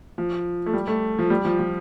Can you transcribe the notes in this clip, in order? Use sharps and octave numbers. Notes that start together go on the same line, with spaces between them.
F3
A3
G3
A3
F3
G3
F3
F3